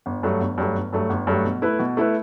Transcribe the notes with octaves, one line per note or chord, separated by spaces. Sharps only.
G1
G2 F#3 A3
G1
G2 F#3 A3
G1
G2 F#3 A3
G1
G2 F#3 A3
B2
A3 E4 B4
B2
A3 E4 B4